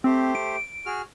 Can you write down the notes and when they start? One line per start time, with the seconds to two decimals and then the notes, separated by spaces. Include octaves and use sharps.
0.04 A3 C4 G4 C5
0.35 D7
0.86 F#4 G#4 F6